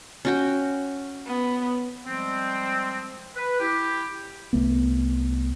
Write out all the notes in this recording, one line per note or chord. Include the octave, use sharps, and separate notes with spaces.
C#4 F#4 G5
B3
F3 G3 G#3 C4
B4
E4 G4
C2 A3 B3